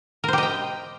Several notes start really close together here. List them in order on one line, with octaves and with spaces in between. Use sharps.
A#4 C5 G4 D#5 G5